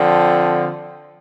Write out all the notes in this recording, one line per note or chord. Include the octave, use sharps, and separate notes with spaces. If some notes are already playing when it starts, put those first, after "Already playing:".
Already playing: D3 F3 C4